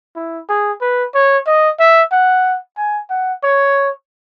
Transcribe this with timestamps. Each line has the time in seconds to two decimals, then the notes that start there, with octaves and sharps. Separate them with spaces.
0.16 E4
0.49 G#4
0.81 B4
1.15 C#5
1.47 D#5
1.79 E5
2.12 F#5
2.77 G#5
3.10 F#5
3.44 C#5